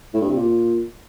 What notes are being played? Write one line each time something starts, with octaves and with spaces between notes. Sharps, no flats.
A2
G2
C3
A#2